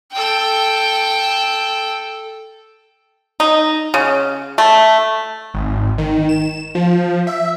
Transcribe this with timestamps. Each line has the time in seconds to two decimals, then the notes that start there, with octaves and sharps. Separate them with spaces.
0.13 A4 G5
3.40 D#4
3.94 C#3
4.58 A3
5.54 G#1
5.98 D#3
6.29 E7
6.75 F3
7.27 E5